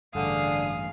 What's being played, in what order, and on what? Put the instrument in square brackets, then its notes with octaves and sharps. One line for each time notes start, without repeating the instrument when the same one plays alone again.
[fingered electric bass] A1 G2 [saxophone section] D3 [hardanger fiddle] G#4 F5 [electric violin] D#6